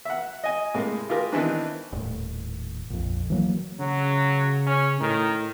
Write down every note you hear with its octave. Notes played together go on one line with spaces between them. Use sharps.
E5 F#5
D#5 G#5
A2 C3 G#3 A#3
F4 G4 G#4 A#4
D#3 E3 B3 C4 D4 B4
D#1 A2
A#1 F2
E3 F#3 A#3
C#3 F#3
C#4
A2 D#3